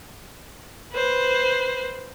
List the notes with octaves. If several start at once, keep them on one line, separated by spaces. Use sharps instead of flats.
B4 C5